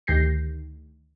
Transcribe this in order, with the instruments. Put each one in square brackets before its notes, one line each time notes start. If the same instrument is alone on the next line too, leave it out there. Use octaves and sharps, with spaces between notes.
[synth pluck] D2 D#3 G4 G6 A#6 C7